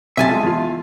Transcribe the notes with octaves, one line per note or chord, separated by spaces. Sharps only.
B1 C3 E5 G#5 A5
G#3 F4
E2 F4